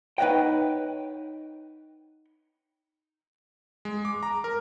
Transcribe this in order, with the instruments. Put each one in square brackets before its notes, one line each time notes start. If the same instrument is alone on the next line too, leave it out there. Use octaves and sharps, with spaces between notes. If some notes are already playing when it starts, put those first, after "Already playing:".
[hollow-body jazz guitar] D#4 B4 C#5 D#5 F#5 G5
[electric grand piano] G#3
D6
A#5
A#4